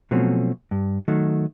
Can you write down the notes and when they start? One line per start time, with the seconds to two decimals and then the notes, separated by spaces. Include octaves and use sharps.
0.11 B2 F3 F#3 A3 C4 C#4
0.71 G2
1.08 D#3 F#3 A3